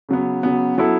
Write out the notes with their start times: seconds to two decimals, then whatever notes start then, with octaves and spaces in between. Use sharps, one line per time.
0.09 C#3 F#3 B3
0.43 C#3 F#3 B3
0.78 F#3 B3 E4 A4